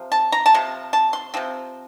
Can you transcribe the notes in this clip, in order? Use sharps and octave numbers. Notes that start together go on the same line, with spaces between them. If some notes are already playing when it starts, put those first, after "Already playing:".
Already playing: C3 F3
A5
A#5
A5
C3 F3
A5
C6
C3 F3 C4